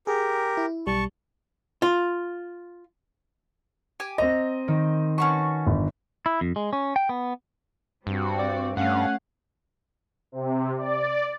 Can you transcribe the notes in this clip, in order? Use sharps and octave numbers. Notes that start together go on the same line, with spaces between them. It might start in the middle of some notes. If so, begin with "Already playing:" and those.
G4 G#4 A#4
E4
B1 G3 A5 C#6
F4
G4 G#5
C4 D#5 A#5
D#3
C#4 F#4 B4 A5 C#6
G1
E4
F2
G#3
C#4
G5
B3
G2 G3 C4 F#4
D5
G2 A3 C#4 F5 F#5
C3
D5